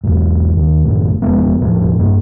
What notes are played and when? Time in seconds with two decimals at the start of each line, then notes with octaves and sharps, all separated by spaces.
0.04 E2 G#2
0.57 D#2
0.85 F#1 A2
1.22 E1 F3 G#3 B3
1.61 E1 A2 F3
1.99 G2 A#3